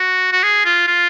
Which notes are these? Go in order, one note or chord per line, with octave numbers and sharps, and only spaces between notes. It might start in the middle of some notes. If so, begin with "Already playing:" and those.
Already playing: F#4
F#4
G#4
F4
F4